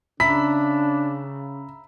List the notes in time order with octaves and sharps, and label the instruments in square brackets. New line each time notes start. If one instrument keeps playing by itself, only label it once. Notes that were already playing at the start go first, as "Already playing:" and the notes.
[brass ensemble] C#3 [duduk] D4 [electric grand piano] E5 A#5 B5 [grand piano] B6